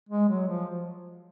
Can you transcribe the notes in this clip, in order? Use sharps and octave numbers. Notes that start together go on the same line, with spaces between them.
G#3
F#3
F3